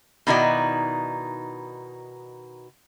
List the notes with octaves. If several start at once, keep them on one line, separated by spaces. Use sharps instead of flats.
B2 D#3 D#4 E4 F#4 D5